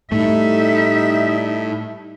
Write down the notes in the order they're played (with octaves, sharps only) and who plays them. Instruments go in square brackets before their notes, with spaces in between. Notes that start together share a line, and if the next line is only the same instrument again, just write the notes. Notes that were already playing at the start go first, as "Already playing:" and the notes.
[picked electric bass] A2 A3 [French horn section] G3 [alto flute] D#4 [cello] E5